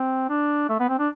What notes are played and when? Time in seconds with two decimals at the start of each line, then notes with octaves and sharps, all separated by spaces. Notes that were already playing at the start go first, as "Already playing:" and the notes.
Already playing: C4
0.29 D4
0.69 A3
0.80 B3
0.89 C4
0.99 D4